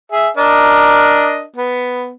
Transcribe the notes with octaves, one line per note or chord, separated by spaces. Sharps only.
G#4 E5
D4 A#4 D#5
B3